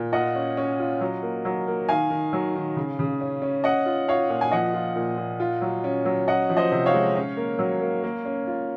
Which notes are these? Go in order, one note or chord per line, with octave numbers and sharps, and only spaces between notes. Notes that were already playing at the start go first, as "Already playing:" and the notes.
Already playing: A#2
F4 D#5 F#5
C#4
C#4
F4
F#3
A#3
F#3
A#3
D#3 F5 G#5
D#3
F#3
D#3
C#3
C#3
C#4
C#4
C#4 D#5 F#5
F4
F4 C#5 F5
A#2
G#5
F3 D#5 F#5
F4
A#2
A#2
F4
F#3
C#4
F#3
C#4 D#5 F#5
F3
C5 D#5
C3
C#5 F5
G#3
C#4
A#3
F#3
A#3
A#3
C#4
F4